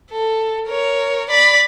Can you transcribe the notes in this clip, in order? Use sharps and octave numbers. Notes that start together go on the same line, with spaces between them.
A4
A#4 C#5
D5 B5